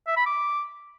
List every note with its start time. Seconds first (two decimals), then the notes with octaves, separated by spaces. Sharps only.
0.07 E5
0.17 B5
0.26 D6